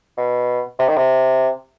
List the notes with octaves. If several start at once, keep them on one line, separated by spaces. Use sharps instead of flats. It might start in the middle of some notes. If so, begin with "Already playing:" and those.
B2
C3
D#3
C3